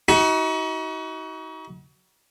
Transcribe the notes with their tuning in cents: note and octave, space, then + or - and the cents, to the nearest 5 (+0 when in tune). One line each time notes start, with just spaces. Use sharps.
D#4 +40 F#4 +25